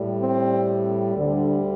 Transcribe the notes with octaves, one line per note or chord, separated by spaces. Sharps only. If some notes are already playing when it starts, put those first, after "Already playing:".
Already playing: A2 G3
C4
D2 D3 G3